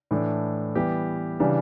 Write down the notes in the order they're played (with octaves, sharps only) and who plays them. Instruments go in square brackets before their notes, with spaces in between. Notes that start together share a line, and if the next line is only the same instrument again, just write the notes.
[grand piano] A2 E3 A3 D4
E3 G3 B3 G4
C#3 E3 G3 D4